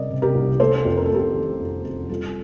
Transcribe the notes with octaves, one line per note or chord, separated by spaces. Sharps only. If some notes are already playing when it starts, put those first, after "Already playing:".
Already playing: C3 G3 A#4 D5 D#5
C3
G4 A#4
C2
A3 A4 C5
F2
A#4
A4
A3 G4 A#4
D#3
F2
F2
G3 F4 A4